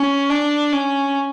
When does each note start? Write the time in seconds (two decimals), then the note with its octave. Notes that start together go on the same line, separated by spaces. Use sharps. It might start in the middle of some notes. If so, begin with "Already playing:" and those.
Already playing: C#4
0.30 D4
0.72 C#4